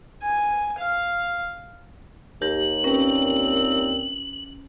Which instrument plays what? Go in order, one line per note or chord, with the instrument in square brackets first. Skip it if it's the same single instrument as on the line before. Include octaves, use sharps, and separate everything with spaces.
[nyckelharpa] G#5
F5
[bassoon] D#2 [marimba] G4 A#4 [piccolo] F#7
[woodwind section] A#2 C4 [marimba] C#4 A#4 B4